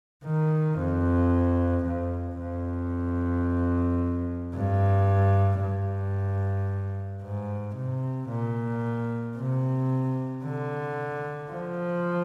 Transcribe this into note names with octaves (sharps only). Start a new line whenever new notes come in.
D#3
F2
F2
F2
G2
G2
G#2
C3
A#2
C3
D3
F3